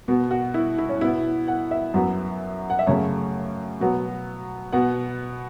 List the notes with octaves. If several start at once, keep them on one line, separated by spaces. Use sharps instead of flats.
B2 B3
F#4
E4
E4
C#4
B2 B3 E4
F#5
E5
F#2 F#3 B3
F#5
E5
F#2 C#3 A3 C#5
B2 F#3 B3
B2 B3 F#5